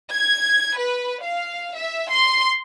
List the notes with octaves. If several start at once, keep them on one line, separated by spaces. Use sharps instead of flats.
G#6
B4
F5
E5
C6